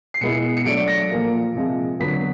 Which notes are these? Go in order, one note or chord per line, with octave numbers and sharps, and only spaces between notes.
C7
B2 G#3 B3 E4 C#7
C#7
F#3 A3 D4 D7
A#6
A#2 F3 A#3
C3 F3 G#3
D3 F#3 B3 B6